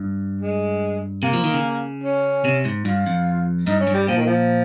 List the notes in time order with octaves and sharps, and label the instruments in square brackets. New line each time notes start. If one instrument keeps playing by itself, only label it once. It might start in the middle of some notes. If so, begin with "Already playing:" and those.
Already playing: [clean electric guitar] G2
[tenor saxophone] G#3
[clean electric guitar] C3 [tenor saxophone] A#3
[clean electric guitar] F3
D#3
C#3
[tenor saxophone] C#4
[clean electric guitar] C3
G#2
[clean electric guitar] G2 [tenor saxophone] F4
[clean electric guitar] F2
[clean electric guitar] G2 [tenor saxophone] D#4
[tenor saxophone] C#4
[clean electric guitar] G2
[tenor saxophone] G3
[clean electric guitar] A#2 [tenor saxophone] F3
[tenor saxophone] D#3
F3